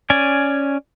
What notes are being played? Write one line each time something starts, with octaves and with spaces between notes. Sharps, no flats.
C#4 D5 G#5